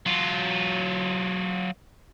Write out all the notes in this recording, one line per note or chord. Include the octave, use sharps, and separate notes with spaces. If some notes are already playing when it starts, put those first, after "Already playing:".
F#3 F4